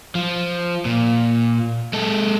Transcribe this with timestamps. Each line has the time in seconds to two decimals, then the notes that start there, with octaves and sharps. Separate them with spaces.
0.15 F3
0.85 A#2
1.93 G#3 A4